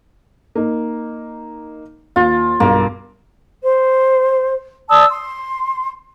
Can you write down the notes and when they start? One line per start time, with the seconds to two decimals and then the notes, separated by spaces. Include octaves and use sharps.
0.55 A#3 D#4
2.16 D#2 F4
2.60 B1 G2 A#3
3.63 C5
4.89 D5 A5 D#6 E6
5.09 C6